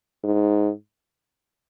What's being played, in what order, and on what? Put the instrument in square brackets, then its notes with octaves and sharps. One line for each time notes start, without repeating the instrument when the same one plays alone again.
[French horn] G#2